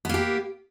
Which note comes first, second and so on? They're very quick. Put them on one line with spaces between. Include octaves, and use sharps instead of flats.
B3 A#3 G4